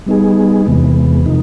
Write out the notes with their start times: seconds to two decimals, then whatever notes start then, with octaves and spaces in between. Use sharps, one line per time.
0.06 G3 B3 D#4 G#4
0.66 E2 C3 E3 G#3 B3
1.26 C3 F3 A#3 D#4